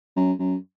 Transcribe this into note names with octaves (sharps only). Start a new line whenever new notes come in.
F#2
F#2